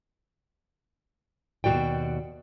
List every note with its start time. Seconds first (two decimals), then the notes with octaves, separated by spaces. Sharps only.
1.64 D#2 B2 A3 F#4 D5 G5